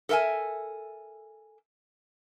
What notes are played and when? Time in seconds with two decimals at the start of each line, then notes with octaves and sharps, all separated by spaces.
0.09 A4 A#4 E5 G5 G#5